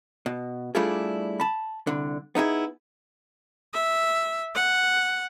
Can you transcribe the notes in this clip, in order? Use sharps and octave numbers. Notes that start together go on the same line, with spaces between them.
B2
G3 A3 D4 E4 F4 G#4
A5 B5
C2 D3
B3 D#4 E4 G#4
E5
F#5